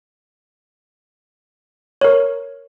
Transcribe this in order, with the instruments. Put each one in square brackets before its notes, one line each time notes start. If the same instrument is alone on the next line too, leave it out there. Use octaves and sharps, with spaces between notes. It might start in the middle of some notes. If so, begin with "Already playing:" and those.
[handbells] A#4 C#5